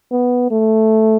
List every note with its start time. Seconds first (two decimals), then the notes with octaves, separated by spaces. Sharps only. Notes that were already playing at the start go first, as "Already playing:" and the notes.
0.12 B3
0.51 A3